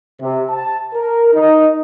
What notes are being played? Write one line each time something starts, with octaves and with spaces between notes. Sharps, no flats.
C3
A5
A#4
D#4